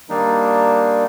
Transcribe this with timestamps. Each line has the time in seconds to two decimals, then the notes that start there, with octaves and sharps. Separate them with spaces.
0.10 D#3 G3 A#3 D4 D#4